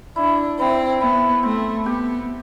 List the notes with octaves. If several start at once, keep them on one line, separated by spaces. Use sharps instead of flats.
D4 E4
C4 E4
B3 E4
A3 C4
B3 G4